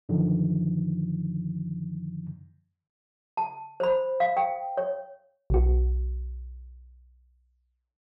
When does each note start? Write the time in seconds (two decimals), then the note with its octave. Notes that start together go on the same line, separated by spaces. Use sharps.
0.09 F#2 D3 D#3 F3
3.37 A5
3.80 C5 B5
4.20 F5
4.37 G5
4.77 C#5
5.50 B1 F#4